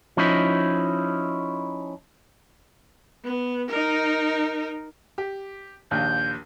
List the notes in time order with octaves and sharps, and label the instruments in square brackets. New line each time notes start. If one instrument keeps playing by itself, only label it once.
[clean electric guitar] F3 C#4 D#4 E4
[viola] B3
D#4 A#4
[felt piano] G4
[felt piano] A#1 D#2 [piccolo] G6